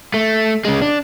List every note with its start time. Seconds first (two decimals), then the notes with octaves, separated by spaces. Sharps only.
0.14 A3
0.65 C#3 G#3
0.82 D4